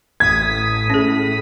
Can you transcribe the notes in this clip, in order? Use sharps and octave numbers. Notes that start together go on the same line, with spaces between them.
A1 D#6 G#6 B6
A2 C#4 G#4